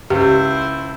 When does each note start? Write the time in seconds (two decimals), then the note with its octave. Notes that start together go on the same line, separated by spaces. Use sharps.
0.10 C#2 E4 G4 C5